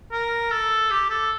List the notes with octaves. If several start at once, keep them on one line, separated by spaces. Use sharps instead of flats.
A#4
A4
G4
A4